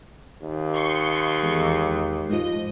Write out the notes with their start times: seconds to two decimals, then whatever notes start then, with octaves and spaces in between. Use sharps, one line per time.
0.42 D#2
0.73 C6 C#6 C7
1.43 E2 G#3
2.30 G#2 F3 D#5